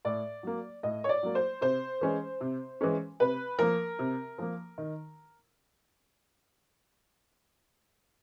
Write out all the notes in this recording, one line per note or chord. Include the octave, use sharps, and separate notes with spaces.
A2 D5
F#3 A#3
A2 D#5
C#5
D5
F#3 A#3
C5
C3 C5
E3 G#3 C#4
C3
E3 G#3 C#4
C3 B4
F3 A#3 A#4
C3
F3 A#3
D#3